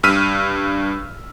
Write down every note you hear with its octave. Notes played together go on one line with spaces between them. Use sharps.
G2 E6 F6 B6 D#7